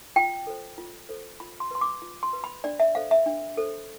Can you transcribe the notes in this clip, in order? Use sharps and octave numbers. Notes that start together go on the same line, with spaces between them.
F4 G5
A4 C5
F4
A4 C5
F4 B5
C6
B4 C6
D6
F4
C6
B4
B5
D4 D5
E5
A4 C5 F5
E5
D4
A4 C5